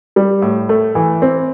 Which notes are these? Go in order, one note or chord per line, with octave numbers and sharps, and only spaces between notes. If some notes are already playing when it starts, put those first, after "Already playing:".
G3
A2
A3
E3
C4